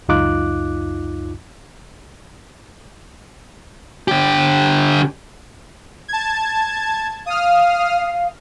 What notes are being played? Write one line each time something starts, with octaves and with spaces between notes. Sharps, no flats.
C#2 F#2 D#4 F4 D6 F#6
D3 G4
A5 G#6
F5 D#6 F6